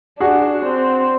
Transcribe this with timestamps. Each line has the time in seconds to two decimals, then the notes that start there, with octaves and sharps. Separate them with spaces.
0.20 D4 F#4 G#4
0.65 C4